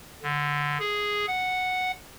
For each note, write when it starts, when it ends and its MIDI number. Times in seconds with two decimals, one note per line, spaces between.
0.23 0.78 50
0.80 1.26 68
1.28 1.92 78